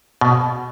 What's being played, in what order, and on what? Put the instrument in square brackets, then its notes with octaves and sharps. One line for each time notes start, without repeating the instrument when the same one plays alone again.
[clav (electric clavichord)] B2